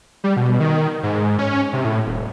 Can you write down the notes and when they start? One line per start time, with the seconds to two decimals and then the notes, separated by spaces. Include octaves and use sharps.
0.24 G3
0.37 B2
0.60 D#3
1.03 G#2
1.39 C#4
1.73 C3
1.85 A2
2.07 D#1